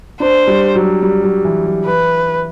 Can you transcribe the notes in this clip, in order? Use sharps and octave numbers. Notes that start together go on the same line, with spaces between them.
D4 C5
G3
F#3
G3
F#3
E3
F#3
E3 B4